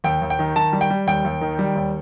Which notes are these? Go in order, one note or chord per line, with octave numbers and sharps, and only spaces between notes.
D#2 G5
D#2
G5
D#3
D#3 A5
G3
G5
G3
D#2 G5
D#2
D#3
G3
D#2